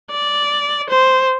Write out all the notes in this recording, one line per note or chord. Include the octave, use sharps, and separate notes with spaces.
D5
C5